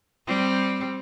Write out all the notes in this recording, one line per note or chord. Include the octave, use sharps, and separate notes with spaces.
G3 C4